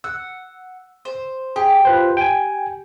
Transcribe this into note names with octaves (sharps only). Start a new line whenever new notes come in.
F#5 E6
C5
G4 G#4
F4 B4 C5
G5 G#5